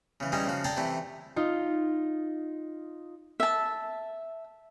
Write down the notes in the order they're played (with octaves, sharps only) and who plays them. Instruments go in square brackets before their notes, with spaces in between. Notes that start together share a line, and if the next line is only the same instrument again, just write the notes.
[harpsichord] C#3 E3
E3 G3 G#3 C#4 D#4 G#4
C#3 F3 F#4
G#4 A4 D5 G5 A#5
C3 E3 A3 E4
[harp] D#4 F4
[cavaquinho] E5 A5